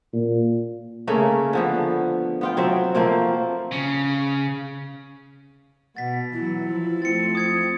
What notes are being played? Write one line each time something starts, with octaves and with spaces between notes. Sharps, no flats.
A#2
C#3 A3 A#3 C#4
D3 F3 B3
B3 F4 G5
F#3 C4 E5
F3 A3 A#3 C4
C#3
B2 F#5 A6 B6
E3 F#3 E4
F3
F3 A3 C4 A6 C#7
D#6 G#6 C#7